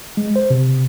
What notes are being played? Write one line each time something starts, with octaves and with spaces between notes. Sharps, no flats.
G#3
C5
C3